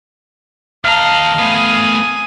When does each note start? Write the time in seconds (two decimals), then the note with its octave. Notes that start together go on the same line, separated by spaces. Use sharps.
0.85 D#2 D#5 F5 A5 A#5 F6
1.39 A3 B3 G#5 D#6